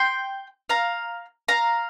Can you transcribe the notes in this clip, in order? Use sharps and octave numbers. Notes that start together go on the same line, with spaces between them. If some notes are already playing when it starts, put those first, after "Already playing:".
Already playing: G5 C6
F5 A#5
F5 A#5